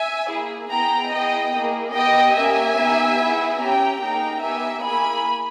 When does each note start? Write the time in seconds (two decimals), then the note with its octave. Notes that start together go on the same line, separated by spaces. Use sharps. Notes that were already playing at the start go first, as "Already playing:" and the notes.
Already playing: E5 G#5
0.29 A#3 E4 G#4
0.70 B3 E4 G#4 G5 A#5
1.12 B3 E4 G#4 D#5 G5
1.53 A#3 E4 G#4
1.94 B3 G4 D#5 G5
2.36 A#3 C#4 G4 E5 G#5
2.77 B3 D#4 G4
3.19 B3 E4 G#4
3.60 C#4 G4 G5 A#5
4.02 A#3 D#4 G#4 G5 A#5
4.42 B3 D#4 G4 E5 G#5
4.84 A#3 E4 G#4 G#5 B5